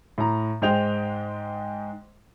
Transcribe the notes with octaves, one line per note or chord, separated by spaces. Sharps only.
A2 A#5
G#2 G#3 C5 D#5 G5 F7